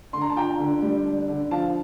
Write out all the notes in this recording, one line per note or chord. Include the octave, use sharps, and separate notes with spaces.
D3 C6
A#5
A5
F4 G5 A#5
D3
G3
D4
D3
F3 F5 A5